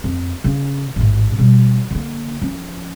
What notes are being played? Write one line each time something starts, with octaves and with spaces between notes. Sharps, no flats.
F2
C#3 C#4
A1 G#2
B2 G3
D3 A#3
F3 C#4